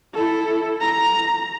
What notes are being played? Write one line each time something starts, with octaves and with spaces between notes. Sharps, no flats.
E4 A4
A#5